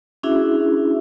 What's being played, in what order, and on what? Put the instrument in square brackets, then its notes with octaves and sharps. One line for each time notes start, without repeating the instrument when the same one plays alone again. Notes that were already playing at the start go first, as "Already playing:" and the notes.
[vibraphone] C#4 D4 E4 F#4 G#4 E5